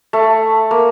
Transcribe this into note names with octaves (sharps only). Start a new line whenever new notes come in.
A3
A#3